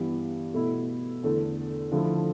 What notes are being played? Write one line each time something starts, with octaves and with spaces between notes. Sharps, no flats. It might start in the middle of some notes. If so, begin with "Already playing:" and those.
Already playing: G2 E3 B3
B2 A3 E4
E2 D3 A3
D3 F3 A3 E4 A4